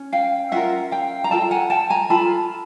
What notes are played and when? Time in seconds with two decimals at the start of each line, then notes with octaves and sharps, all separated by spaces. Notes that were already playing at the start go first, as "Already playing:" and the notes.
Already playing: C#4
0.12 F5 G5
0.52 C#4 F4 A#4 E5 F#5
0.92 F5 G5
1.24 A#5
1.31 F4 A4 G5 A5
1.51 F#5 G#5
1.70 G5 A5
1.90 G#5 A#5
2.10 F4 A4 A5 B5